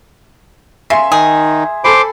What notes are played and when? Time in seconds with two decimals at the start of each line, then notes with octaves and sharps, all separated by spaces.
0.90 C#3 E5 G#5 C6
1.12 D#3 D#4 G#4
1.84 A4 C5 G#5 B5 C6 D6